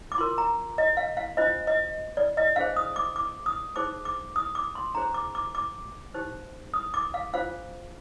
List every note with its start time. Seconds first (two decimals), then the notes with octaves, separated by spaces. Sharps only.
0.12 D6
0.18 F4 A#4 C6
0.38 A#5
0.78 D#5
0.97 F5
1.17 F5
1.37 D4 F4 C5 D#5
1.67 D#5
2.17 D5
2.37 D#5
2.56 D4 G#4 C5 F5
2.76 D#6
2.96 D6
3.16 D6
3.46 D#6
3.76 D#4 G#4 C5 D6
4.05 D6
4.36 D#6
4.55 D6
4.75 C6
4.95 D4 G#4 C5 A#5
5.14 D6
5.35 D6
5.55 D6
6.14 D#4 G4 C5
6.74 D#6
6.94 D6
7.14 F5
7.33 D4 F4 C5 F5